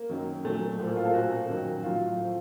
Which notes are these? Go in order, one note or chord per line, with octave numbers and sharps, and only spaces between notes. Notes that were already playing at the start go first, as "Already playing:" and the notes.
Already playing: A#3
F#2 D#3 F#3
A#2 F#3 A3
A2 F3
A#3
F4
A4
A#2 F3 F#4
F#2 D#3 F#3
A2 F#3 F4
A2 F3